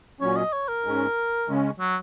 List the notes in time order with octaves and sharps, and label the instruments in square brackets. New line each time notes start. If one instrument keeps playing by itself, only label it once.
[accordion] A#2 F#3 C#4 [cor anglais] C#5
[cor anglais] D#5
C#5
A#4
[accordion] G#2 G#3 C#4
C#3 G#3 C#4
[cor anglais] F#3